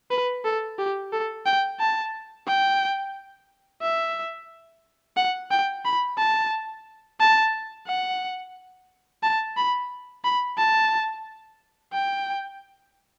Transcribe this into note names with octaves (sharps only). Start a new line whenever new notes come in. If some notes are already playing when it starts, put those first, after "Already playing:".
B4
A4
G4
A4
G5
A5
G5
E5
F#5
G5
B5
A5
A5
F#5
A5
B5
B5
A5
G5